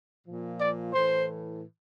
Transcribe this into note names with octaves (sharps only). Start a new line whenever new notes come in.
A#2 F3
D5
A2 E3 C5